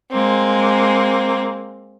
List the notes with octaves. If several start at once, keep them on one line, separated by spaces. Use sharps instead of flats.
G#3 A#3 C4